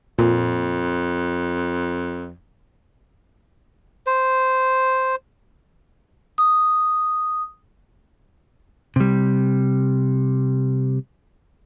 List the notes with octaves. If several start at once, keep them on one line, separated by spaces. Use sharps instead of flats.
F2 A#2
C5
D#6
C3 G3